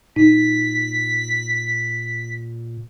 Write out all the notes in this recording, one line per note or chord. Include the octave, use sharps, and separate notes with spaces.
A#2 D#4 B6